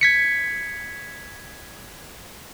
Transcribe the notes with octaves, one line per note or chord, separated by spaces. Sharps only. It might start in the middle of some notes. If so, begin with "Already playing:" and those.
G#6 B6 C#7